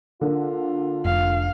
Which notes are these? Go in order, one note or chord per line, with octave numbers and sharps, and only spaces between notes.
D3 A#3 F4
F1 F5